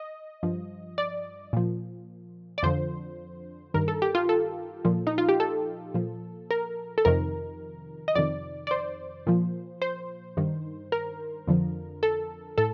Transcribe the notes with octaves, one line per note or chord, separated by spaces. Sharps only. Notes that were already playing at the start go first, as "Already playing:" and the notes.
Already playing: D#5
G2 F3
D5
A#2 F3
D5
F2 D3 F3 C5
G2 D#3 A#4
A4
G4
F4
A4
A#2 F3
D#4
F4
G4
A4
A#2 F3
A#4
A4
F2 C3 D#3 A#4
D#5
F2 C3 D#3 D5
D5
C5
A#2 F3
C5
G2 D#3
A#4
F2 D3 F3
A4
A2 A4